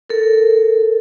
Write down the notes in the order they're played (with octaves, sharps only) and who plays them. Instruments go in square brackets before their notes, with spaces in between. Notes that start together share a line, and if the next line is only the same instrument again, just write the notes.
[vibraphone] A4 A#4